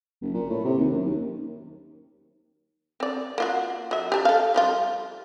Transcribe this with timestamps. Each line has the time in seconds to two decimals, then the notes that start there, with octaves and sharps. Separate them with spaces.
0.21 F#1
0.34 A#2
0.50 A2
0.65 C3
0.78 D#2
0.91 F#2
1.05 D#2
3.00 C4 D5
3.38 A#3 F4 F#4
3.91 F#3 E5
4.12 G4 A5 A#5
4.25 A4 F5
4.54 F3 G3 F4